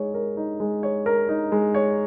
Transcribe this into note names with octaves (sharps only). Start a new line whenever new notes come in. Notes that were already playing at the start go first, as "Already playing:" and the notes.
Already playing: G#3 D#4 C#5
A#4
D#4
G#3
C#5
A#4
D#4
G#3
C#5